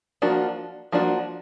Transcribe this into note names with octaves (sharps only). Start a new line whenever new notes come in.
F3 A#3 D4 F#4
F3 A#3 D4 F#4